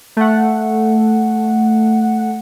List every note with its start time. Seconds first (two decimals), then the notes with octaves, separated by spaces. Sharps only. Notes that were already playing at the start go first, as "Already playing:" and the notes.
0.17 A3 F#5